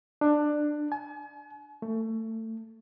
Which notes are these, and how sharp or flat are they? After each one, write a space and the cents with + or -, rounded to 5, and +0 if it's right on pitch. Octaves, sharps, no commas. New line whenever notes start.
D4 +15
G#5 +45
A3 +25